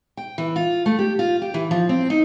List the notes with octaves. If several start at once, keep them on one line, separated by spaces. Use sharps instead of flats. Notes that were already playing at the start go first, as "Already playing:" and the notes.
G5
E3
F4
A3
G4
F4
G4
E3
F3
C4
D#4